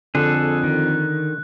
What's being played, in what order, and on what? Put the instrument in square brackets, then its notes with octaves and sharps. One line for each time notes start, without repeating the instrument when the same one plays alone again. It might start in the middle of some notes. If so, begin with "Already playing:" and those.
[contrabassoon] F2 [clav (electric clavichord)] D3 [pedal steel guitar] G#4 A4 [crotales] F#6
[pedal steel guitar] D#3